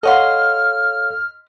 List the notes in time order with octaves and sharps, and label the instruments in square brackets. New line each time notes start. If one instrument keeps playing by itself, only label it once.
[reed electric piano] A4 C#5 F5 [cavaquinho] D#5 F#5 C6 [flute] F6